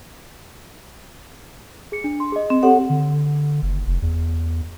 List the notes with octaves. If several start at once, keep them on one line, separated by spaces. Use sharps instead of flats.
G#4 C#7
D4
C6
G#4 D#5
C4
G4 A4 C#5 F#5
D3
F#1
F1
E2